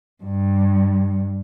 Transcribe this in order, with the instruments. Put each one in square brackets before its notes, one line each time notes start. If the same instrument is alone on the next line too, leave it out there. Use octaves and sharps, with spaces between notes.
[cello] G2